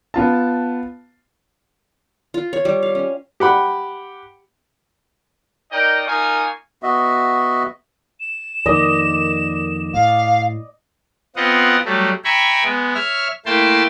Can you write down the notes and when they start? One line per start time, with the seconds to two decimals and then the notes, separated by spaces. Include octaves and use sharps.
0.14 B3 F4 A5
2.34 F4
2.53 C#5
2.65 G3
2.83 F5
2.95 C#4
3.40 G4 F#5 B5
5.72 D#4 A#4 D5 D#5 G5
6.06 A#3 D#4 F4 A#4 G#5 C#6
6.83 B3 F#4 D#5 E5
8.20 E7
8.66 F2 D#3 A#3 D5 D#5
9.94 A2 F5
11.36 B3 C4 F4 D#5 F#5
11.85 F#3 G3 A3
12.24 E5 G5 G#5 A#5 B5 C#6
12.64 G#3 B3
12.94 C#5 E5 F6
13.46 A3 A#3 E4 G5 A5 C6